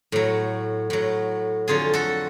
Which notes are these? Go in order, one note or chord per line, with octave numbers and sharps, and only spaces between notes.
A2 F#3
A2 F#3
F2 D3 F#3 F4 G#4
F#4 A4